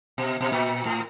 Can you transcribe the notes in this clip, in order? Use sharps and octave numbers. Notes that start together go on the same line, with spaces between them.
B2
B2
A#2
A2